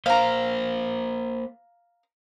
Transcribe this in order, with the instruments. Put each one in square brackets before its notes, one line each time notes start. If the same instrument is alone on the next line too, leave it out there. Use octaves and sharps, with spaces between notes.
[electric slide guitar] A#3 C5 [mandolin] F5 A#5